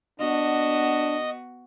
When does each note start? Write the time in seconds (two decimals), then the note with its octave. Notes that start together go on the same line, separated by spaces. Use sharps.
0.20 B3 D4 F#4 D#5